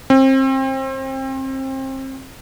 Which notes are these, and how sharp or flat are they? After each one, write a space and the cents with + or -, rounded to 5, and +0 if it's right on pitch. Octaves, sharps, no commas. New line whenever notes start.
C4 +30